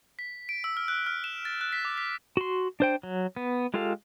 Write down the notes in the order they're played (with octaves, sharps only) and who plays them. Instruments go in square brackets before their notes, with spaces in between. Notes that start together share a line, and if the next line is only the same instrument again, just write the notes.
[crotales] B6
D7
E6
F6
F#6
F6
E7
A6
F#6
B6
D6
B6
[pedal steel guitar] F#4 C6
D4 C5 G5
F#3
B3
G#3 F4 G4 A4 F5